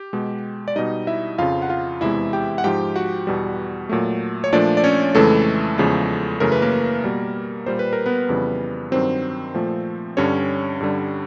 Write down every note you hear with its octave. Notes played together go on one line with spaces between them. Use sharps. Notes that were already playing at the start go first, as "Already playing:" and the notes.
Already playing: G4
B2 G#3
D5
B2 G3 D#4 D#5
E4 E5
F2 C#3 F3 F4 F5
F#5
F4 F5
E2 C3 E3 G#3 E4 E5
G4 G5
F#5
G#2 F3 G#3 G4 G5
F#4 F#5
E2 B2 G3
A#2 F#3 A3
C#5
A#2 F3 A3 D4 D5
D5
C#4 C#5
F2 C#3 E3 G#3 A3 A4
E2 C#3 F3 G#3
F#2 C#3 E3 A3 A#4
B4
A#3 A#4
B2 G3
A#2 G3 C5
B4
A#4
B3 B4
F2 C#3 E3 G3
G2 D#3 F#3 C4 C5
A#2 F3 A3
G2 D3 G3 C#4 C#5
G2 D3 G3